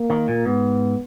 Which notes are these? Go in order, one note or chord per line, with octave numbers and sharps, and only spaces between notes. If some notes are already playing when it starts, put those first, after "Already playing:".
Already playing: A#3
D#3
A#2
G#2 B3